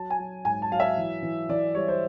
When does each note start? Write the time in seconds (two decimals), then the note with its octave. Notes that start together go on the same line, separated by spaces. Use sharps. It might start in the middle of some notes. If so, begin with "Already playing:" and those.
Already playing: F#3 A5
0.10 G#5
0.19 F#3
0.45 G#2 G#5
0.62 A5
0.71 F#3 F5
0.80 E5
0.97 E3
1.22 E3
1.49 E3 D5
1.75 G3 C#5
1.88 C5